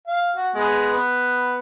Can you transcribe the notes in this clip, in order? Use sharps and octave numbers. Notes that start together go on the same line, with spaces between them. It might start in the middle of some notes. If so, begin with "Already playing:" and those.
F5
F#4
G#3 B3 G#4
B3